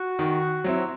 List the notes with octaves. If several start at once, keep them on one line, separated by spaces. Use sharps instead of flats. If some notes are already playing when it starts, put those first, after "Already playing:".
Already playing: F#4
D#3
F#3 C4 E4